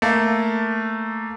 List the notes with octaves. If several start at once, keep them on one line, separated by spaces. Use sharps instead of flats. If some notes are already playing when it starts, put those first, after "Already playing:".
A3 A#3